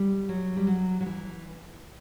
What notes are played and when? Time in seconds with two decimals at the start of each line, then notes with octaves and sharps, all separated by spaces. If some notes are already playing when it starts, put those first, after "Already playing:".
Already playing: G3
0.29 F#3
0.57 G3
0.67 F#3
1.00 F#3
1.06 E3